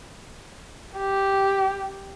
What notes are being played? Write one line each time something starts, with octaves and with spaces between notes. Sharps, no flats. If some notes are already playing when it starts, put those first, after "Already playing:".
G4